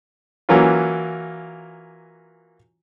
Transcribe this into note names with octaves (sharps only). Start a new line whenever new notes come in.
E3 F#3 A#3 C#4 F4